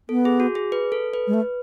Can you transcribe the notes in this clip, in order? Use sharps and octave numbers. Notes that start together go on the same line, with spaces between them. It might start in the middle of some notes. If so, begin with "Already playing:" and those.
B3 A4
G#4
F#4
G#4
B4
A4
B4
G#3
A3